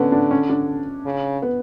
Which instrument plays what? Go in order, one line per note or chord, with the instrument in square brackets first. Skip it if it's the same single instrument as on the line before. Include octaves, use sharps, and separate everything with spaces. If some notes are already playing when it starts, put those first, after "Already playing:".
Already playing: [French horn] D3 [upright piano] B3 C#4
[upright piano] D4
C#4
D4
[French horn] C#3
[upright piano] B3